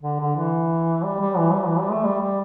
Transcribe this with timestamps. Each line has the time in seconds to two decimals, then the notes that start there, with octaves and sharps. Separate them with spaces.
0.03 D3
0.20 D3
0.36 E3
1.04 G3
1.20 G3
1.38 E3
1.53 G3
1.67 E3
1.79 G3
1.91 A3
2.04 G3
2.20 G3